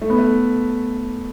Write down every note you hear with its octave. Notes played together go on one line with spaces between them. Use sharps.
A3
B3
A3